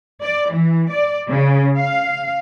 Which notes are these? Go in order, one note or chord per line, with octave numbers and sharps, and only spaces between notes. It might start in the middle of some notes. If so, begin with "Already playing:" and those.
D5
E3
D5
C#3
F5